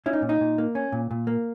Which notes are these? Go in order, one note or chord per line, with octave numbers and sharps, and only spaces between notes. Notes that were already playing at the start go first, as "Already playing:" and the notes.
C#4 E4
D#4
A#2
D#4
A#2
A#3
C#4
A#2
A#2
A#3